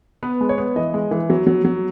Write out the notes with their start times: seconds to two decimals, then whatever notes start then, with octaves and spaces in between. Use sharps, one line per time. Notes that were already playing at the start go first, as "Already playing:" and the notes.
0.23 B3 B4
0.41 G#3
0.49 C#5
0.58 B3
0.76 E3 D#5
0.94 G#3
1.11 E3
1.30 F#3
1.47 F#3
1.64 F#3